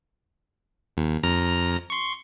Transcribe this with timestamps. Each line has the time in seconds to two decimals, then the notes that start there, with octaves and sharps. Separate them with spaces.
0.97 D#2
1.23 F2 A#5 F6
1.90 C6 C#6